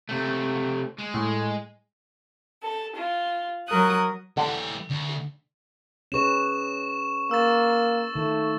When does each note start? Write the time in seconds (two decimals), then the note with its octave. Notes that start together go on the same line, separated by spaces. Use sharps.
0.09 C3 A3
0.99 G#3
1.14 A2
2.61 A4
2.94 F4
3.67 F#3 A#4 D#6 F#6
4.37 D3 E3 G4
4.90 D2
6.12 C#4 G#4 B4 C#6 E7
7.31 A#3 E6 A6
8.15 D#3 A3 F4